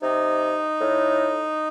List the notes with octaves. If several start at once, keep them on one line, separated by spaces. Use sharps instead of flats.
C3 D#4
A2